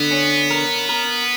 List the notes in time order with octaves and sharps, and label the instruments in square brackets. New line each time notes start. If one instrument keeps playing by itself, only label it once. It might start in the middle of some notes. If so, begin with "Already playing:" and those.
Already playing: [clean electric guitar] D3 [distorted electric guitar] B3
[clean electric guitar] C#4
A#4
A#4